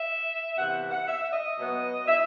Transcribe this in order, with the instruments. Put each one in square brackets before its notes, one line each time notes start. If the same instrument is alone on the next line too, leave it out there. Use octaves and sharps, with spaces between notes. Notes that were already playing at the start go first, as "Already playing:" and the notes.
Already playing: [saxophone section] E5
C3 E3 B3 F#5
F#5
E5
D#5
B2 F#3 B3
E5